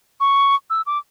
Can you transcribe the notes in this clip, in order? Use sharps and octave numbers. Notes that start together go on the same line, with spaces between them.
C#6
E6
D6